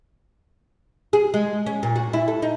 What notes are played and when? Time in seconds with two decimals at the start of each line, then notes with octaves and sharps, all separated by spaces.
1.13 G#4
1.34 G#3
1.66 C#4
1.83 A#2
1.96 F#4
2.13 E4
2.28 A4
2.42 D#4